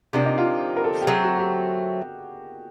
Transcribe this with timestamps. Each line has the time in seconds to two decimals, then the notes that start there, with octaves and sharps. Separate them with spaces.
0.13 C3 F3 A#3 D4
0.26 D#4
0.38 F4
0.77 A#4
0.84 A4
1.02 G4
1.07 F#3 A3 C4 G#4
1.23 F#4
1.38 G4